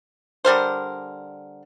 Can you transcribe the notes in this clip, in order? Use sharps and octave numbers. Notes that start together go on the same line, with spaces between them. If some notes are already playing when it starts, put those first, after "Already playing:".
D3 G3 A#4 C5